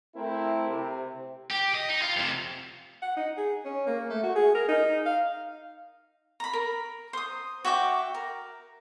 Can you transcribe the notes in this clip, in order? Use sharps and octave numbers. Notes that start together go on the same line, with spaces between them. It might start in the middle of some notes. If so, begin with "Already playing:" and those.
A3 C4 E4 A#4
C3
G4
D#5
D#4
F4
F2 C3
F#5
D#4
G#4
C#4
A#3
A3
F#4
G#4
A#4
D#4
F5
A#5 B5
A#4
C5 D#6
F#4 E5 G5 D6
A#4